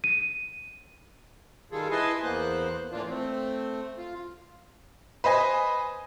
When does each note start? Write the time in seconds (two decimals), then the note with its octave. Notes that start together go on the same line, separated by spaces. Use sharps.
0.04 D#7
1.72 D#3 G3 F4 G#4 A4
1.91 E4 B4 D#5 G#5 A5 C6
2.24 E2 A#3 B3 C5 F#6
2.92 A2 E3 F3 A#3 D4 F4
3.09 A3 C4
3.98 F4
5.24 B4 C5 D#5 G#5